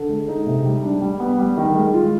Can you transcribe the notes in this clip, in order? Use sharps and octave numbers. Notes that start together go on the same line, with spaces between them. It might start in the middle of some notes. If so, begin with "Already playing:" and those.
Already playing: D3
G#3
D#4
C3
G3
D4
G3
B3
G3
D#3
G#3
F4